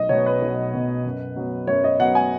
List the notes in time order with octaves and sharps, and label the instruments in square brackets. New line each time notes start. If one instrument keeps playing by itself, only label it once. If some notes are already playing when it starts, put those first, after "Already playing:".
Already playing: [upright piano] B1 D#5
B2 F#3 B3 C#5
B4
B1
B2 F#3 B3
F#2
F#3 B3
F#2 C#5
D#5
F#3 B3 F#5
G#5